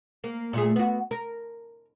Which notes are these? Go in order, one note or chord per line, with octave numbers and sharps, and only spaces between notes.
A#3
A#2 A3 G#4
B3 F#4
A#4